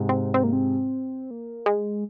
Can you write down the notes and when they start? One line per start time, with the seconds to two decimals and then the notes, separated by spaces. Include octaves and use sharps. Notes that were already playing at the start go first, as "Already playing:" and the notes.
Already playing: G#2 C3
0.09 C4
0.34 C4
0.44 A#3
0.53 C4
1.31 A#3
1.66 G#3